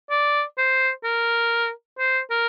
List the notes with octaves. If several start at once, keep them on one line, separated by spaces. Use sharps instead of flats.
D5
C5
A#4
C5
A#4